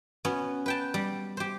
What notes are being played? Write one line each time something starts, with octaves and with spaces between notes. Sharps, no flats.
B3 C#4 F#4
B4 G5 A5
G3
G4 C5